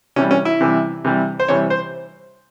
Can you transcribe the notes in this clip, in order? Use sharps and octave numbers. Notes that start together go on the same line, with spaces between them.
C3 E3 G3 C#4
C#4
E4
C3 E3 G3
C3 E3 G3
C5
C3 E3 G3 C#5
C5